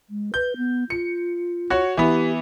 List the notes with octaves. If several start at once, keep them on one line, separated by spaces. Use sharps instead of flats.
G#3
B4 G6
B3
F4 C#7
F#4 C#5
E3 B3 G4